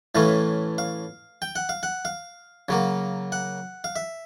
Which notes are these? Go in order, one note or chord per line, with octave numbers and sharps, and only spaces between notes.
A2 E3 A3 C#4 F5
F5
G5
F#5
F5
F#5
F5
C#3 F#3 A#3
F#5
F5
E5